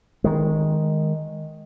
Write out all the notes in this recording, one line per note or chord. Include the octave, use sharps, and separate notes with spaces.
D#3 G#3